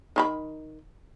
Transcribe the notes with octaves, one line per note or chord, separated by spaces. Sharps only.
D#3 F4 B5